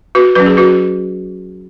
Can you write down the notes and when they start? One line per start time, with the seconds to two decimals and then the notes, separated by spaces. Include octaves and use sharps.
0.15 F#4 B4
0.35 F#3 C#4 B4
0.46 G#4
0.57 F#4 B4